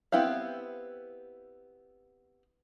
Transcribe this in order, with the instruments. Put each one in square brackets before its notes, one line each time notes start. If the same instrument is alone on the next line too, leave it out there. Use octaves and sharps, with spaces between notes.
[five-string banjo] B3 C4 E4 G4 F5